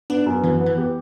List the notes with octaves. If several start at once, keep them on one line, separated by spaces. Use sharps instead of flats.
B3 D4
F#2
E3 B3
B3
E3
G4